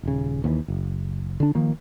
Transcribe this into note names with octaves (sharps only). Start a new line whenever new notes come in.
D#1 C#3
D#2 D3 E3
F#1
D3 D4
D#3 F3 A#3